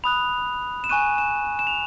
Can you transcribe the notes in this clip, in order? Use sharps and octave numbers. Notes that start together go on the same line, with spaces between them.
B5 D#6 F#6 F7
E7
G#5 C#6 F#6 D#7
E7
E7
F7